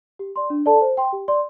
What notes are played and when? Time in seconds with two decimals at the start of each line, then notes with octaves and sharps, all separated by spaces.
0.19 G4
0.36 D5 C6
0.50 D4
0.66 A4 D5 A5
0.81 C5
0.97 G5 C6
1.13 G4
1.28 D5 C6